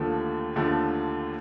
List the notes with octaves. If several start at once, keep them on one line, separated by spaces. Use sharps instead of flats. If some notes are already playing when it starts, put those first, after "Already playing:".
Already playing: D#2 D3 F3 A3
D#2 D3 F3 A3